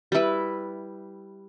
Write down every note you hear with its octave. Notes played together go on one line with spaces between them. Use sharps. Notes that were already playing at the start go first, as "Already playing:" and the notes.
G3 E4 B4